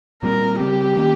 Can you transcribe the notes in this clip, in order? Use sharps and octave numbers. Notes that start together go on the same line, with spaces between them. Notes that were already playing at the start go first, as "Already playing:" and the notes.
A#2 G3 C4 A#4
C#3 G3 C4 G4
D#3 A#3 C#4